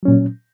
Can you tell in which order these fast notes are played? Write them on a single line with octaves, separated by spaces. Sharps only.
F#3 C#4 A#2